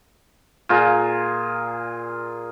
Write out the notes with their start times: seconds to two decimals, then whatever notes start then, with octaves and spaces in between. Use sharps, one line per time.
0.69 A#2 F4 G#4 A#5